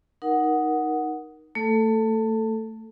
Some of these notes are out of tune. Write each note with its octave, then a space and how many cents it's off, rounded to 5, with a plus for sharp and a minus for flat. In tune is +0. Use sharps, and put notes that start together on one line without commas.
D#4 +0 A#4 +20 F#5 +0
A3 +25 A4 +0